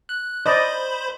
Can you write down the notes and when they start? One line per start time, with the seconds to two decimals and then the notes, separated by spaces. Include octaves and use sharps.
0.09 F#6
0.46 C5 D5 D#5 B5